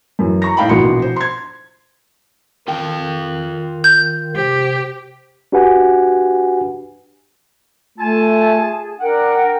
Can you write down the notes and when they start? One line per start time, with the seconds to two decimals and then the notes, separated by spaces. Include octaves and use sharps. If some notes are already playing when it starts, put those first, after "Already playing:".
0.19 F#2 E3
0.42 A#5 C#6 A#6
0.57 A2 D#4 F5 G5 A5 B5
0.69 A#1 B2 E3 F#4 C6 C#7
1.02 C5
1.16 C6 G#6
2.68 D#3 F4 F5 G5
3.84 G6
4.36 C3 G4 C5
5.52 D4 F#4 G4 B4 F#5 G#5
7.98 A3 F4 G#5 A5
8.56 G#4
9.00 D4 A#4 F#5 G5